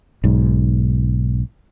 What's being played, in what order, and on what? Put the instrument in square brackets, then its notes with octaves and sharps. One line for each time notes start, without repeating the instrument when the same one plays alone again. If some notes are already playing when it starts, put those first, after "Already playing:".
[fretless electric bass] B1 G#2